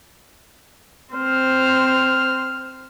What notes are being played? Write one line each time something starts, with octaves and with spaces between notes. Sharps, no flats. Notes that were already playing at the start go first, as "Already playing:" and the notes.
C4 C5 F6